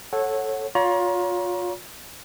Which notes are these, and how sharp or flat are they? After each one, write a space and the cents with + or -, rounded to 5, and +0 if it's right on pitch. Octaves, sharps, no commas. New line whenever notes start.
A4 -5 C#5 -20 F#5 +0
F4 +30 C#5 +35 A#5 +35